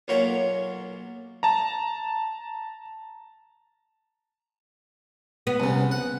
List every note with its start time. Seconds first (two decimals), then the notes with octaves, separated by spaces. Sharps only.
0.08 B1 A#2 F#3 C#4 C#5 A#5
1.43 A5 A#5
5.47 B3
5.60 C2 C#3
5.91 F#5